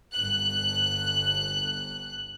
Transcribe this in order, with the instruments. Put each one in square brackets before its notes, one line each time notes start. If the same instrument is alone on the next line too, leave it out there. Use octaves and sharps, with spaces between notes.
[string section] G1 F#6